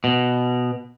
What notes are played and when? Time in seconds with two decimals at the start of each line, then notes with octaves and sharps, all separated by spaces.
0.04 B2